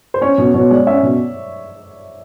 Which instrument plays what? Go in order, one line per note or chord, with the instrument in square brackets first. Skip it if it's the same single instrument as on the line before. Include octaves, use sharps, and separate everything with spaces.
[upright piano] C5
[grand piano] C#4 [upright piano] C#5
[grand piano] B2
[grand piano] B2 [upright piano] C#5
[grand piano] G#3 [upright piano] D5
[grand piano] C#4 [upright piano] E5
[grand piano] B2